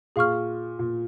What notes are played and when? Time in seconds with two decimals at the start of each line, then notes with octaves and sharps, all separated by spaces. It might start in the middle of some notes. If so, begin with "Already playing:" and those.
0.16 A#2 G#4 F5 C#6 F6
0.79 A#2